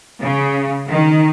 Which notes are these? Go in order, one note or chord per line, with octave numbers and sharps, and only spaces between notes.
C#3
D#3